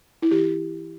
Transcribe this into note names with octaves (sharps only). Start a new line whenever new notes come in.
E4
E3 G4